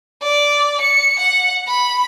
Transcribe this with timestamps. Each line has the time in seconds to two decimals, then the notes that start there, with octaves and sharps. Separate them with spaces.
0.22 D5
0.81 C#7
1.19 F#5
1.68 B5